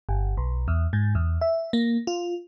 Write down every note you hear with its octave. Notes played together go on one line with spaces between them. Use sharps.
G1
B1
E2
G#2
E2
E5
A#3
F4